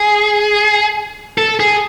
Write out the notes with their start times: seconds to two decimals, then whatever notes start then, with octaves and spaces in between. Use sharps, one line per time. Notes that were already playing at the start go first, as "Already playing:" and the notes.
Already playing: G#4
1.38 A4
1.60 G#4